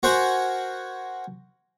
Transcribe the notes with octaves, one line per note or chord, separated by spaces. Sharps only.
F#4 A#4 C5 F#5 G#5 B5